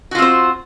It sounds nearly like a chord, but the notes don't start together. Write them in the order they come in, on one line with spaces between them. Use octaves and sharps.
F#4 F4 C4 C5